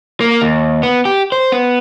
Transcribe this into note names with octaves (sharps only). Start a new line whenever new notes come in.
A#3
D#2
B3
G4
C5
B3